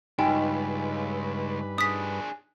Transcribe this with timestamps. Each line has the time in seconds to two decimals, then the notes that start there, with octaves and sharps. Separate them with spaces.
0.19 C#2 G2 D#4 B4 D#5 G5 G#5
1.78 D4 G#4 D#6 B6